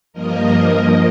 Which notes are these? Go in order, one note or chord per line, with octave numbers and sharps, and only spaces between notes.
G2 F3 A#3 A#4 D#5